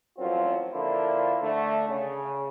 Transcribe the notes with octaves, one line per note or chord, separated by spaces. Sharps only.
A1 F#2 F3 F#3 C4 F4
D3 F3 A#3 D4 E4 F4
D3 A3
C#3